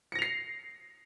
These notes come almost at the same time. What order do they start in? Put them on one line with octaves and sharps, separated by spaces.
C#7 A#6 F7 C7